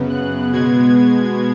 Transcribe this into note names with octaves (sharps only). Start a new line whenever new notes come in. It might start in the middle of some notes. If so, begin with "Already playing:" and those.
Already playing: F#2 C#3 B3
F#6
B2 G#3 B3 G#6